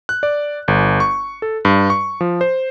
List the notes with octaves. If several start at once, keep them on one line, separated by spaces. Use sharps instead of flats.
F#6
D5
G1
C#6
A4
G2
C#6
F3
C5